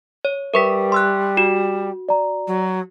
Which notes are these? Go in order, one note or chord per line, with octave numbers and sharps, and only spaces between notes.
C#5
G3 A#4 B4 E5 C#6 B6
C6 E6 F#6
F#4 E7
D5 A#5
F#3